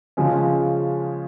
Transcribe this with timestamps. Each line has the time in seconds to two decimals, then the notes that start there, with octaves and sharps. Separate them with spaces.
0.17 C#3 F3 G#3 C#4